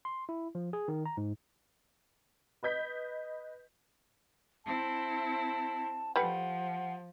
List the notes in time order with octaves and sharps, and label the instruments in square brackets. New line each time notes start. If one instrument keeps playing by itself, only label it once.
[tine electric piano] C6
E4
F3
G#4
D#3
A#5
G#2
[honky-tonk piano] B4 D#5 G6 B6
[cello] C4 E4 [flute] A5
[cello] F3 [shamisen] G3 A3 B4 [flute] F#5